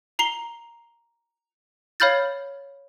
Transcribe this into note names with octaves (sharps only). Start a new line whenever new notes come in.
A#5 C7 F7 G7
C#5 F5 B5 F6 G6 A6